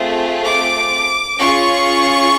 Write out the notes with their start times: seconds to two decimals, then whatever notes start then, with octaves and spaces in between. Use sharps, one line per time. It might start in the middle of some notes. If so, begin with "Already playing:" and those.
Already playing: A3 C4 F4 G#4
0.46 D6
1.39 C#4 F4 G#4 C#6